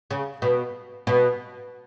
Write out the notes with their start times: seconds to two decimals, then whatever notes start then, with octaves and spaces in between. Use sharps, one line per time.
0.11 C#3
0.42 B2
1.07 B2